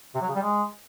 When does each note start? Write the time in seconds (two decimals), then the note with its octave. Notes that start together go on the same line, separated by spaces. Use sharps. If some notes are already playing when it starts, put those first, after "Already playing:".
0.15 C3
0.22 F#3
0.28 C#3
0.35 G3
0.42 G#3